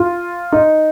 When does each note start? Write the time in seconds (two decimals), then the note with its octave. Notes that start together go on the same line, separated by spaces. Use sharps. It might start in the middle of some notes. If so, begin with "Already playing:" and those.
Already playing: F4
0.52 D#4